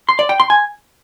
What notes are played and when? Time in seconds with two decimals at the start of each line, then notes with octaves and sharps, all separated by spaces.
0.09 C6
0.19 D5
0.29 G5
0.40 C6
0.50 G#5